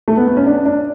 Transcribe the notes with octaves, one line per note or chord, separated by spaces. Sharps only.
A3
B3
B3
C#4
D4
D4